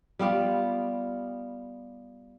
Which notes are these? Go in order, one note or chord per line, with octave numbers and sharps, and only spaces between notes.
G3 B3 F4 G4